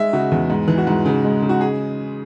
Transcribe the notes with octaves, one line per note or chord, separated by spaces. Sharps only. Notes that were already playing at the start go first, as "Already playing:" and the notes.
Already playing: G#3 E5
C#3 F#4
E2
G#2
E3
F#4
G#2
C#3
G#3
C#3
F#4
G#4